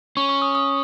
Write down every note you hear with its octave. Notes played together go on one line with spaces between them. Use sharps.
C#4 C#6
C#6
D#6
D#6